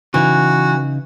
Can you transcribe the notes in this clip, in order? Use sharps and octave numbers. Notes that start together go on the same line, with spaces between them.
C#3 E3 D#4 F#4